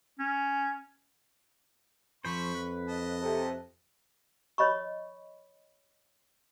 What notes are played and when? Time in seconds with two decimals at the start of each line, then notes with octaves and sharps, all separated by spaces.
0.19 C#4
2.25 F2 F3 C5 B5 C#6
2.55 B4
2.88 D#5 A5
3.21 C3 A4
4.58 C#5 D#5 B5 C#6